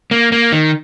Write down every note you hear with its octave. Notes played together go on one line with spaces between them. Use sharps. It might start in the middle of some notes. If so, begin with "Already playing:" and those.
A#3
A#3
D#3